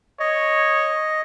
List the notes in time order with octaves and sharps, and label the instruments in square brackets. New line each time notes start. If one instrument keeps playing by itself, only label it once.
[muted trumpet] C#5 [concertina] D#5